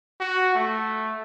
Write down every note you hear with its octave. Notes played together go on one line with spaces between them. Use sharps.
F#4
A3